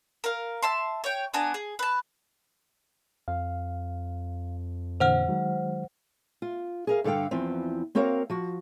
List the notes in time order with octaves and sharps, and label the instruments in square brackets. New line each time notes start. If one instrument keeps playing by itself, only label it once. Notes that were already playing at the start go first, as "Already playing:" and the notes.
[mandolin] A#4 F5
E5 A5 C6
C#5 G5
B3 D4 G#5 A#5
G#4
B4 A5
[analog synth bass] F2 [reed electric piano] F5
[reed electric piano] A#2 D3 E3 [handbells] C5 F#5 F6
[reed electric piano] D#3 F#3 G#3
[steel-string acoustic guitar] F4
G#4 A#4 F5
G2 D3 A4 F5 G5
E2 E3 F3 C4
A#3 C4 F#4 A#4 C#5 F5
F3 F#4